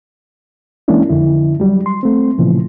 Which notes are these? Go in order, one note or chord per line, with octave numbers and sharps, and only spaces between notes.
E3 G#3 A#3 C#4 D4 E4
F2 D3 E4
F#3 G3
C6
A3 C4
A#2 C#3 E3 F3